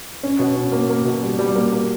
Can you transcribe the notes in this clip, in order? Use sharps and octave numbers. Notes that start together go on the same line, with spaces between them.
C#4
B2
C#4
A#3
A#3
B2
G3
G3
A#3
A#3